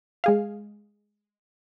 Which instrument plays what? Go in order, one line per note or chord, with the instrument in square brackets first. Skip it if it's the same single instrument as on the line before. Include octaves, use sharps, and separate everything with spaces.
[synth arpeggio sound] G#3 G#4 F5